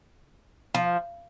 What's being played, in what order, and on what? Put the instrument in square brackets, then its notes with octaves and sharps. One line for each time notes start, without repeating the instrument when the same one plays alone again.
[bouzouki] F3